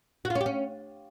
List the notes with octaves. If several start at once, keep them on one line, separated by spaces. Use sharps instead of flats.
F#4
F4
C#4
G4
C#4